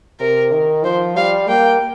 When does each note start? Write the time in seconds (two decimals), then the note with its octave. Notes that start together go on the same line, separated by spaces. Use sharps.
0.20 C3 A#4
0.52 D#3
0.85 F3 C5
1.17 G3 F5
1.49 A#3 G5